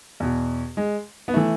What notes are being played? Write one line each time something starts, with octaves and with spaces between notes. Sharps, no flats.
E2 B2
G#3
B3
E3 A3